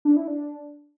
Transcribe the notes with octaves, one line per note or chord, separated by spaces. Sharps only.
D4
E4
D4